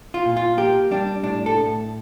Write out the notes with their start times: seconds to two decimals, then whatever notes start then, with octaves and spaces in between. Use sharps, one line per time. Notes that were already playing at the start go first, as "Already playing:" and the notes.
0.14 F4
0.25 A#2
0.37 F4
0.57 A#3 G4
0.91 G3 D4
1.23 A2 D4
1.46 A4
1.57 A2